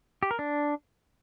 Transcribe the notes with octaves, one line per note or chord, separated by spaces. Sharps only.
G4
A#4
D4